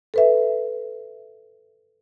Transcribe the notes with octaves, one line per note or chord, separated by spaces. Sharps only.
A4 B4 E5